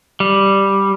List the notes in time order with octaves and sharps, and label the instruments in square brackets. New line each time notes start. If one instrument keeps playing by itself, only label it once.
[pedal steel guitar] G3